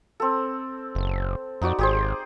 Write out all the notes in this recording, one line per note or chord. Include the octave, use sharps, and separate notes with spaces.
C4 A4
F#1
F2 D#4 F#4 D5
G#1 G4 G#4 C5